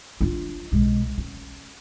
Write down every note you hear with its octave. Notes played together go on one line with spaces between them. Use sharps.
D4 F4
B1 G#3
C#4